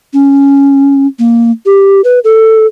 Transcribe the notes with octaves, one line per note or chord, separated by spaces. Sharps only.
C#4
A#3
G4
B4
A4